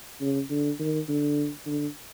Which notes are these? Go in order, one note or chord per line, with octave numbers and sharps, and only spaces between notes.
C#3
D3
D#3
D3
D3